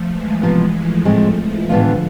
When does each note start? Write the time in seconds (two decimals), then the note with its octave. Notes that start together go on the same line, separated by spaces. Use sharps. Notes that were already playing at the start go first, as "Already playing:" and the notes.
Already playing: F3 A3
0.10 E3 G#3
0.42 C3 F3 B3
0.73 F3 A3
1.05 A2 F3 G#3 A3 C4
1.37 E3 G#3
1.69 A2 D3 E3 F3 B3 D4 F4